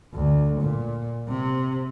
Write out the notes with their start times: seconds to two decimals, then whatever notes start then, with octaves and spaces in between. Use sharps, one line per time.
0.14 D2
0.61 A#2
1.28 C3